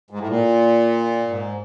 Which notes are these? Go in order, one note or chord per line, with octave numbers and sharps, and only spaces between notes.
G#2
A2
A#2
G#2